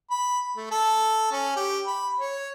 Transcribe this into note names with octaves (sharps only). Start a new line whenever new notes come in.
B5
A3
A4
C#4
G4
B5
C#5